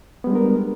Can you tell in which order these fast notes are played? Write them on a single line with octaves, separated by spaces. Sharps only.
B3 G3 G#3 D4 A#4